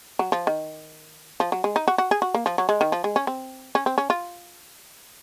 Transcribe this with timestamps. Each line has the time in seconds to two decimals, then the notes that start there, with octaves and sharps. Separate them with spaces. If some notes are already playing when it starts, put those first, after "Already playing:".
0.19 F#3
0.32 F3
0.47 D#3
1.40 F3
1.52 F#3
1.64 G#3
1.76 D#4
1.88 F#4
1.98 F#4
2.11 G#4
2.22 F#4
2.34 A#3
2.46 F3
2.58 F#3
2.69 G#3
2.81 D#3
2.92 F3
3.04 G#3
3.16 C#4
3.27 C4
3.75 C#4
3.86 C4
3.98 C#4
4.10 F4